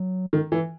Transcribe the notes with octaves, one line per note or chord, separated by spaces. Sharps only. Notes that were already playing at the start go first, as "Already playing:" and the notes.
Already playing: F#3
D#3
E3